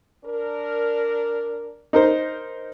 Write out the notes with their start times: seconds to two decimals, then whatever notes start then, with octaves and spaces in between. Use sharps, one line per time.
0.25 D4 A#4
1.93 D#4 A#4 C5